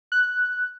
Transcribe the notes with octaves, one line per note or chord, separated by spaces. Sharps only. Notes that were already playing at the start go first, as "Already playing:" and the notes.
F#6